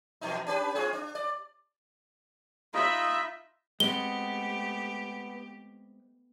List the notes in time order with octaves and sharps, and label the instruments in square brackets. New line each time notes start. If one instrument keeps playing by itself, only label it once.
[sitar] E2 B2 D#4
C#4 G4 B4
C4 F4 G#4
D4
D5
[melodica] D#4 F4 D#5 [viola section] E5 B5
[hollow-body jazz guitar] G#3 C4 [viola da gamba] A3 G4 [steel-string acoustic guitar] B3 [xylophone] G7